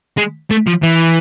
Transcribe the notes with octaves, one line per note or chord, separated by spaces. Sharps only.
G#3
A3
F3
E3